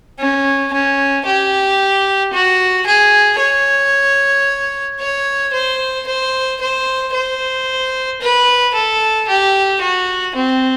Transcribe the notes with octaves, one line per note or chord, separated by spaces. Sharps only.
C#4
C#4
G4
F#4
G#4
C#5
C#5
C5
C5
C5
C5
B4
A4
G4
F#4
C4